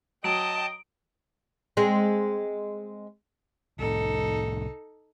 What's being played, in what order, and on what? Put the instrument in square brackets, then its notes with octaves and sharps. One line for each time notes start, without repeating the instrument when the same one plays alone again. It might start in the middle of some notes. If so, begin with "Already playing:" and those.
[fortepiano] F#3 [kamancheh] D#5 G5 [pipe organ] A5 [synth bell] D7
[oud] G#3 C4
[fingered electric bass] C2 A2 [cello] D#4 A4